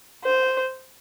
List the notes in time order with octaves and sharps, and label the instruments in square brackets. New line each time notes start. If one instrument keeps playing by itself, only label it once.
[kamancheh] C5